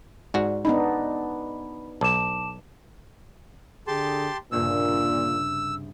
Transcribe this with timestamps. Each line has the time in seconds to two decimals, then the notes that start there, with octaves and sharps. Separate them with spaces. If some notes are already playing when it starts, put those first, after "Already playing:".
0.34 G#2 F#4 D5
0.65 B3 D4 D#4 B5
2.01 B1 A5 D6 E7
3.87 D3 G4 G#4 A5 C6
4.52 C2 G2 A#2 C#3 E6